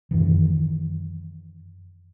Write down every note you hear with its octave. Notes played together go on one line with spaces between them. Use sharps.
F#2 D#3 E3